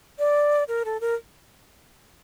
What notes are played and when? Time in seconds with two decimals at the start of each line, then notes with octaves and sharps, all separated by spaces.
0.19 D5
0.68 A#4
0.85 A4
1.01 A#4